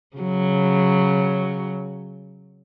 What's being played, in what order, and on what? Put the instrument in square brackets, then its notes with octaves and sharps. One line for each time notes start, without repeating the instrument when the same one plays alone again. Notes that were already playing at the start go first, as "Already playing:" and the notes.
[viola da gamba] C#3 F#3